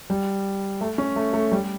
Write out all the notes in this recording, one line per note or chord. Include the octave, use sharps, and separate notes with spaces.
G3
A3
C#4
A3
A3
G3